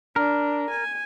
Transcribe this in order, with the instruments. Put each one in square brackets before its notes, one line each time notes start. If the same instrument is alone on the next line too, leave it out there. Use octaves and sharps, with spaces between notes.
[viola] D4 [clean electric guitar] A#4
[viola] G#5